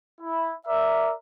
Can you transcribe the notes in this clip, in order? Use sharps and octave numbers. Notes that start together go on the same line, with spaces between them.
E4
A#4 D5 E5